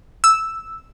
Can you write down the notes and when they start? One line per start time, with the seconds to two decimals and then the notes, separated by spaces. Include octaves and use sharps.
0.24 E6